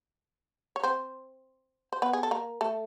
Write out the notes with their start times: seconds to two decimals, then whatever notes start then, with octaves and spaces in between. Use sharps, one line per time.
0.76 C#5
0.83 C4 C5
1.93 C5
2.02 B3 B4
2.13 G#4
2.23 A4
2.31 A#3 A#4
2.61 A3 A4